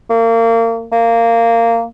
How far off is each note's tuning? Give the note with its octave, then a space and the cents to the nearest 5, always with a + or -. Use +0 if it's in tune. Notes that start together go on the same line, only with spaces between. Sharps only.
A#3 -30
A#3 -15